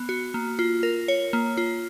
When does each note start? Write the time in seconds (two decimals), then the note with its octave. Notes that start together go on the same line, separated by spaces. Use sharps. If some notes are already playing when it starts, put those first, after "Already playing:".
Already playing: B3
0.09 F#4
0.34 A#3
0.59 F4
0.83 A#4
1.08 C#5
1.33 A#3
1.57 F4